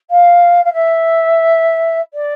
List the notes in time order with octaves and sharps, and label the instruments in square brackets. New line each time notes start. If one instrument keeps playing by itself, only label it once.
[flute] F5
F5
E5
D5